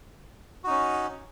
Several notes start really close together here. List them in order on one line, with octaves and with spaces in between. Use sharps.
F#4 D#4 C#4